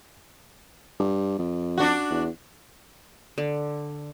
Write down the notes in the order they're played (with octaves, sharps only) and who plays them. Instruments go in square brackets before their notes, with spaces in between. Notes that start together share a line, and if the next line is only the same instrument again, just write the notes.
[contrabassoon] G2
F2
[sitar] D4 F#4
[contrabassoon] E2
[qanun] D3